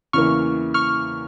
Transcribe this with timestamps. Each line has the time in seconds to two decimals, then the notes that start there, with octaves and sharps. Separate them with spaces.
0.13 E2 C#3 E3 A#3 C#6 F6
0.74 C#6 F6